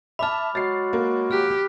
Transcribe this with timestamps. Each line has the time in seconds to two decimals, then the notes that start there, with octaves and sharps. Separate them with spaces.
0.19 E5 A5 B5 D6 F6
0.55 F#3 G#3 F#4 A6 C7
0.93 A#3
1.31 G4 F6 F#6